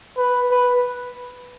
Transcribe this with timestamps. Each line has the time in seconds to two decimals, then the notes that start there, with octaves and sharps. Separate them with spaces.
0.17 B4
0.51 B4